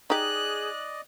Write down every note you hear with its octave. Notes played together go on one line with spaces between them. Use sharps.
D#4 G4 G#4 D5 D#5 F#6